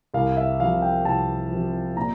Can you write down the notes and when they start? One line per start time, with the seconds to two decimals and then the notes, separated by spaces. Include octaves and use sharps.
0.14 C2 F5
0.37 E5
0.60 C3 F3 F5
0.82 G5
1.05 C2 A5
1.51 C3 F3
1.97 A#2 A#5